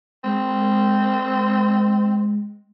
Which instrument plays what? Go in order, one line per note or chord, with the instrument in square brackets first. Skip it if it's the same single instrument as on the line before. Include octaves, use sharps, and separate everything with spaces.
[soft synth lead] G#3 [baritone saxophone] C4